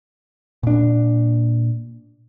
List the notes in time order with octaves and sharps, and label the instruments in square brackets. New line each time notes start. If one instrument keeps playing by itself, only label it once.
[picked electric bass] A#2 D4